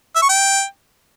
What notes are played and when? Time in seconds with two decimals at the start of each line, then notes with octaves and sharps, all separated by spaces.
0.16 E5
0.22 C#6
0.29 G5